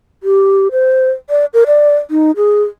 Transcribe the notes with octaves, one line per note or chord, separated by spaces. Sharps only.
G4
C5
D5
A#4
D5
D#4
G#4